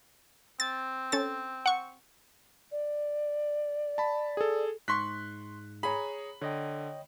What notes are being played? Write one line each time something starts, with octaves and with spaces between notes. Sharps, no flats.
C4 A6
C#4 A4 A6
F#5 C#6
D5
A5 B5
G#4 A4
G#2 C6 C#6 F#6 B6
G#4 C#5 A#5 B5
D3 C#5 D#5 G5